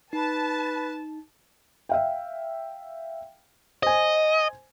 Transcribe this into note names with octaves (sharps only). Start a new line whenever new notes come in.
D#4 B4 A5
E5 F5 G5
C5 D#5 G#5